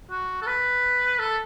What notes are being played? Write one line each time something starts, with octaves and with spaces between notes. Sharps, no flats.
F#4
A4
B4
A4